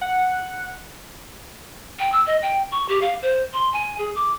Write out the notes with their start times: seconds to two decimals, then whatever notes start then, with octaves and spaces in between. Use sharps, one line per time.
0.01 F#5
1.99 G5
2.12 E6
2.27 D#5
2.42 G5
2.72 C#6
2.89 G4
3.01 F5
3.22 C5
3.53 C6
3.73 G#5
3.98 G#4
4.16 D6